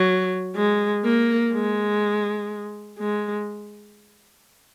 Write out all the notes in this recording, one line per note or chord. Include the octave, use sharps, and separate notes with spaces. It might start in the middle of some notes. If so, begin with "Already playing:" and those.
Already playing: F#3
G#3
A#3
G#3
G#3